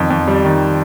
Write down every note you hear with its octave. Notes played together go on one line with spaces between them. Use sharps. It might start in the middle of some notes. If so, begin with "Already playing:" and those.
Already playing: F2 D#3
F2
G3
D#3